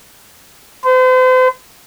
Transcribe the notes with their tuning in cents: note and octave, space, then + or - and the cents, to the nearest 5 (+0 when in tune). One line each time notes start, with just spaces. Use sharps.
C5 -40